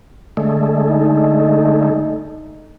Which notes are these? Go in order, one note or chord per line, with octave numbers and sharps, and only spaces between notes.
D3 G#3 A3
D#4